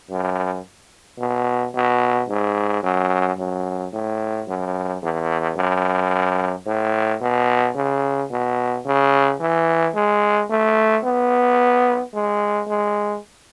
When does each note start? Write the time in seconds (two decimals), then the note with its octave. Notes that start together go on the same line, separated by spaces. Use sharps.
0.10 F#2
1.19 B2
1.74 B2
2.29 G#2
2.83 F#2
3.38 F#2
3.93 A2
4.48 F#2
5.03 E2
5.57 F#2
6.66 A2
7.21 B2
7.75 C#3
8.31 B2
8.86 C#3
9.40 E3
9.94 G#3
10.50 A3
11.04 B3
12.13 G#3
12.68 G#3